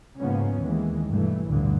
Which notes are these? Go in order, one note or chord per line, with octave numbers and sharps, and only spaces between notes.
G#2 C#3 F3 A#3 B3 C#4
D#2 D#3 E3 G#3
G2 B2 E3 A3
A1 D2 G2 B2 D3